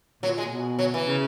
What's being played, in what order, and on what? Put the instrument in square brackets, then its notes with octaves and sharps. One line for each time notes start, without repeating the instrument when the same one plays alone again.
[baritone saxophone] A#2 [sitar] F#3
[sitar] G#3
[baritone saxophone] B2
[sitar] F#3
E3
[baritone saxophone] C#3